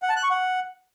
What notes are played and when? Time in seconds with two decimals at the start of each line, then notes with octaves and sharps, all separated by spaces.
0.02 F#5
0.09 A5
0.16 F#6
0.23 C#6
0.30 F#5